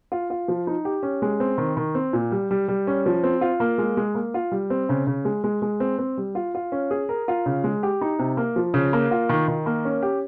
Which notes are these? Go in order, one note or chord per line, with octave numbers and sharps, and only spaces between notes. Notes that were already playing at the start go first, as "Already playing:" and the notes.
F4
F4
F3
D#4
G4
C#4
G#3
C4
D#3
D#3
C4
A#2
G3
G3
G3
C#4
F3
C4
F4
A#3
G#3
G#3
A#3
F4
G3
C4
C#3
C#3
G#3
G#3
G#3
C4
C4
G3
F4
F4
C#4
G#4
A#4
F4
C#3
G#3
G4
D#4
C3
A#3
F3
C#3
A#3
F4
D#3
D#3
A#3
C#4
G4